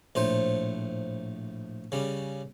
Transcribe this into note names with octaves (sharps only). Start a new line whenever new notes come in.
A#1 A2 C5
C#3 G3